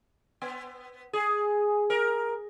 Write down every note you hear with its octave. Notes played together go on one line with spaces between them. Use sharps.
B3
G#4
A#4